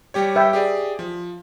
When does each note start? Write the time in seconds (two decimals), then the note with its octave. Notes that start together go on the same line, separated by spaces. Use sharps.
0.14 G3 G4 C#5
0.35 B4 E5 G5
0.53 G4 G#4 D5
0.99 F3